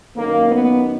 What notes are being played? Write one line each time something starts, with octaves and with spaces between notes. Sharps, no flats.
F#2 D#3 A#3
B3